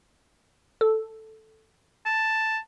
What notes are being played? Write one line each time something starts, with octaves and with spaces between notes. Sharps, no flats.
A4
A5